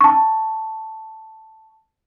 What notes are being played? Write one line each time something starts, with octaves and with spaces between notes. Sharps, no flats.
A5 C#6